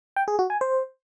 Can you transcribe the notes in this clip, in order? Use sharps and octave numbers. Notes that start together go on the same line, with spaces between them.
G5
G#4
F#4
G#5
C5